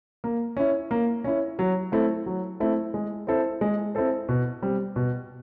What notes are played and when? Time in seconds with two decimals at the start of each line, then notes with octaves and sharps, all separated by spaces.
0.24 A#3
0.57 C#4 E4
0.91 A#3
1.24 C#4 E4
1.59 F#3
1.92 A3 C4 E4 A4
2.26 F#3
2.60 A3 C4 E4 A4
2.94 G#3
3.27 C4 E4 A4 C5
3.61 G#3
3.95 C4 E4 A4 C5
4.29 B2
4.62 G3 C4
4.96 B2